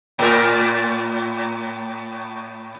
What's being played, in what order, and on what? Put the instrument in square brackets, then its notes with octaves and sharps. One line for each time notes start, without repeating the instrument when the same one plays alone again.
[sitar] A2 A#4